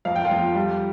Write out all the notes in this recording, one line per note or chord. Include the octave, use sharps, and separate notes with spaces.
F2 F5
G5
F4 F5
F2
G3